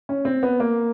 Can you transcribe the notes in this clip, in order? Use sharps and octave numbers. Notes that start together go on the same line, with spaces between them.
C#4
C4
B3
A#3